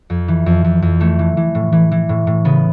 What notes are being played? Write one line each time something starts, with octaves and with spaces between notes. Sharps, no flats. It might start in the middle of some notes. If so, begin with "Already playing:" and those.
F2
E3
F2
F2
F2
E3 A3
E3
E3
A2
E3
E3
A2
A2
C#3 B3